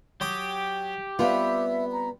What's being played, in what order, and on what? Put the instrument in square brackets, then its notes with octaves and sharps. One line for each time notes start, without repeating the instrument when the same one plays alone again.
[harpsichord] F#3 D6 D#6 [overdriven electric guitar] G4
[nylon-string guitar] G3 C4 F4 [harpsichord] B3 [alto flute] E5
[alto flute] A#5